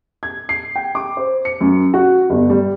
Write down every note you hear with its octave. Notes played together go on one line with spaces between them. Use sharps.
G#6
C7
G5
D6
C5
C#7
F#2
F#4
G1
G3